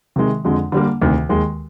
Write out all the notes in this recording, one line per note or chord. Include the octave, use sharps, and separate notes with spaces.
C3 D#3 G#3
F2 D3 G#3
D3 G3 A#3
D2 C3 D#3
D#2 D#3 G#3